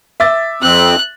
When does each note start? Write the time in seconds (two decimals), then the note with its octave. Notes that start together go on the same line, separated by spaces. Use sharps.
0.20 E5 D6 A6
0.62 F2 C4 F#6